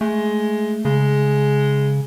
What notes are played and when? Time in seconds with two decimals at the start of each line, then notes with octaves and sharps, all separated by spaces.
0.01 G#3 A3
0.85 C#3 G#3